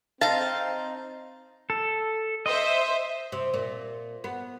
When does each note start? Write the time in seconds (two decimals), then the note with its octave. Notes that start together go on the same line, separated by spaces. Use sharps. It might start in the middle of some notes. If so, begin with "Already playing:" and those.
0.21 C4 D#4 F5 A5
1.70 A4
2.46 C5 D#5 E5
3.32 C3
3.54 A#2
4.24 B3